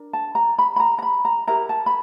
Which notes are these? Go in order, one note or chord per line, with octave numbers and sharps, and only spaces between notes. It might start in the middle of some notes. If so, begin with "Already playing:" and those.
Already playing: D4 A#4
A5
A#5
B5
B5
A#5
A#5
B5
A#5
E4 G4 A#4 A#5
A5
B5